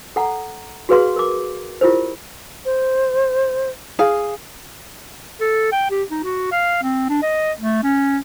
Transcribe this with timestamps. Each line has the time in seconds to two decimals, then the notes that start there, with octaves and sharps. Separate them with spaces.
0.16 A4 F#5 A#5
0.89 F#4 G#4 B4 F5 C6
1.16 A#4 D6
1.81 E4 F4 G4 A#4 C5
2.65 C5
3.99 G#4 F5
5.40 A4
5.72 G5
5.90 G4
6.10 D#4
6.23 F#4
6.52 F5
6.82 C4
7.09 D4
7.22 D#5
7.60 A3
7.83 C#4